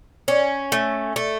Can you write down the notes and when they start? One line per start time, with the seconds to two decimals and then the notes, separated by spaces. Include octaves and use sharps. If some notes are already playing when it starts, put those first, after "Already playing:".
0.28 C#4
0.72 A3
1.16 A3